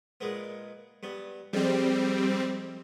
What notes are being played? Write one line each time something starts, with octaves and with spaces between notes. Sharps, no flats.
A#2 G#3 B3
G2 B3
F2 G3 G#3 C4